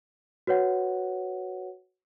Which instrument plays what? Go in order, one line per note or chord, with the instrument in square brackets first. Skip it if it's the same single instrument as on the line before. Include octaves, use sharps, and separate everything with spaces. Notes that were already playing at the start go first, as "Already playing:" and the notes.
[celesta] F#4 B4 C#5 F#5